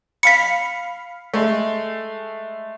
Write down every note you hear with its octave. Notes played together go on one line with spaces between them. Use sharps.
F5 B5 B6 C#7
G#3 A3